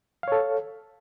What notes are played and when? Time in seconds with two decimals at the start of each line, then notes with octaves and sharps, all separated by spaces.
0.23 F5
0.28 C#5
0.32 A4